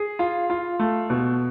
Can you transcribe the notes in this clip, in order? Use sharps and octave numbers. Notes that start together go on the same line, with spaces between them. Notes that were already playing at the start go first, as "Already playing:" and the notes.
Already playing: G#4
F4
F4
A3
B2